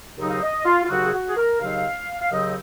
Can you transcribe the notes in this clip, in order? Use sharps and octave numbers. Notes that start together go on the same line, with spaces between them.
D#2 C#3 F#3 C4 D#4
F5
D#5
F4
F4
D#2 C#3 F#3 C4 D#4 F#4
G#4
F#4
G#4
A#4
D#2 C#3 F#3 C4 D#4 F5
F5
D#2 C#3 F#3 C4 D#4 D#5